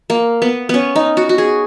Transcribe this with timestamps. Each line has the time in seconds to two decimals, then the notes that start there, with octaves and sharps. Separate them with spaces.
0.10 A#3
0.42 B3
0.69 B3 C#4
0.96 D#4
1.17 F#4
1.29 F#4
1.38 G#4